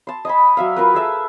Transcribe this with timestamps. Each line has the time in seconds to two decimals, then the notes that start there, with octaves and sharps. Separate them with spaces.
0.07 A5 C6
0.25 D#5 G#5 B5
0.57 F#3 E5 F5
0.76 F4 A#4 B4
0.94 G#4 A4 E5 A5